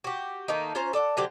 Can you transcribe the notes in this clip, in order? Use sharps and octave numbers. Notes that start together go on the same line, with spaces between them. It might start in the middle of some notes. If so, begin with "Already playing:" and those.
F#4 G4
D#3 A3 A#3 D#4
C#4 F4 C5 A#5
A4 D5 E5 F#5
D3 F#3 C4 G4